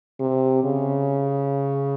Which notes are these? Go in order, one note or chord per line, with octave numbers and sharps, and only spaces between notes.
C3
C#3